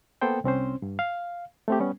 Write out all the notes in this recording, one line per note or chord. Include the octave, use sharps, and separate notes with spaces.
A#3 B3 A4 C5 G5
C2 C4 C#4 C5
G2
F5
A3 C4 G4
G3 B3 C#4